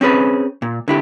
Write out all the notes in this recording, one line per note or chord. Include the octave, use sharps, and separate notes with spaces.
C4 C#4 G#4 B4
A#2
D3 E4 G4